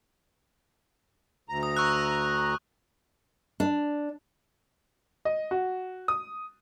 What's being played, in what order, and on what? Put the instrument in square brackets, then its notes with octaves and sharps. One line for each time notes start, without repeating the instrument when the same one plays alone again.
[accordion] D2 A#5
[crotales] D#6
C#6 E6 F#6
[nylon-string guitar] D4
[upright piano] D#5
F#4
D#6